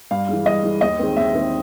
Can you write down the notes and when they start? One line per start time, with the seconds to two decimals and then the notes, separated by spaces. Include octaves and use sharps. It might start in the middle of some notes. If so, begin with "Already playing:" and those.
0.11 G2 F5
0.29 E3 G#3
0.46 G2 D#5
0.64 E3 G#3
0.81 D#2 D#5
0.99 D#3 G#3 C4
1.16 D#2 E5
1.34 D#3 G#3 C4